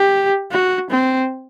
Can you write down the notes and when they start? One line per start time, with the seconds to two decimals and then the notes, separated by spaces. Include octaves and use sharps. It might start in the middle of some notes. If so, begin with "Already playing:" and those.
Already playing: G4
0.51 F#4
0.90 C4